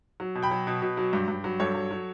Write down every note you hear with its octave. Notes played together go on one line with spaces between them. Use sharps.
F#3
B2
G5 B5
F#3
B2
B2
F#3
G2
G2
F#3
G2 A4 C#5
F#3
F#3